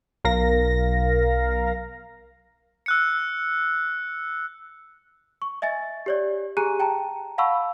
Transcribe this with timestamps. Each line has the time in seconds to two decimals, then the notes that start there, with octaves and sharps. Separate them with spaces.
0.24 B1 A#4 F5 A#6
2.86 E6 F#6 C#7
5.42 C#6
5.62 D#5 E5 G#5 A6
6.06 G4 C#5 D5
6.57 G4 G#4 G#5 A#5 F#6 D#7
6.80 G5 A5 A#5
7.38 F5 F#5 A5 B5 C#6 E6